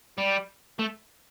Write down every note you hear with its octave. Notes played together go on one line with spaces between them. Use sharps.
G3
A3